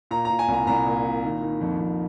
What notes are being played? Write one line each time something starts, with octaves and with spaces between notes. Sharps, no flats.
A#2 A#5
A#5
A#2
G#5
C2 A#5
C2 A#5
A#2
A#2
D#3
D#3
F2
F2